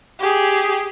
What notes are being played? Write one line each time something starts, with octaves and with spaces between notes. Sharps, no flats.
G4 G#4